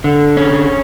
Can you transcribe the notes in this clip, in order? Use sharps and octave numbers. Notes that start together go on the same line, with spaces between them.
D3
C#4